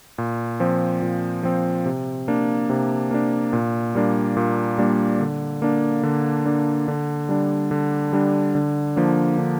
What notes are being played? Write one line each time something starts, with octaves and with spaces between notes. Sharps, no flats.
A#2
F3 C4
A#2
F3 C4
C3
A#3 D4
C3
A#3 D4
A#2
G3 A#3 D4
A#2
G3 A#3 D4
D3
A#3 D4
D3
A#3 D4
D3
G3 D4
D3
G3 D4
D3
F3 A#3 D4
D3